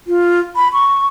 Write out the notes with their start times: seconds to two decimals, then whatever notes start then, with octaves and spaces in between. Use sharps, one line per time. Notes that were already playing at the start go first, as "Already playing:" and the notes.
0.07 F4
0.56 B5
0.73 C#6